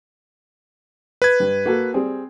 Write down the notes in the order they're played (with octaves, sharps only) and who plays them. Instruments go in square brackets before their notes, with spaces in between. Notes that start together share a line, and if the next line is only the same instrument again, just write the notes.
[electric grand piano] B4 G#6
[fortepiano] G2
A#3 F#4 A4
G3 C4 G#4